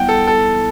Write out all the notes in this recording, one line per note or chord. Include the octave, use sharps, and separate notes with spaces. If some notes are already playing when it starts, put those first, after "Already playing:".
Already playing: G3 B3 E4 F#5 G5
A4
A4